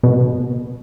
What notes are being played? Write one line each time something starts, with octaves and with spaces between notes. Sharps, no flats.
B2